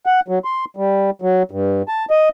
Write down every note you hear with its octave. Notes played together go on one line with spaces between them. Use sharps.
F#5
F#3
C6
G3
F#3
G2
A5
D#5